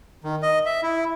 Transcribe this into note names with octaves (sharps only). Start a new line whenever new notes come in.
D#3
D#5
E5
E4